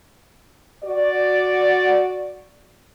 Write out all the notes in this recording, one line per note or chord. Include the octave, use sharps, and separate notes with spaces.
F#4 D5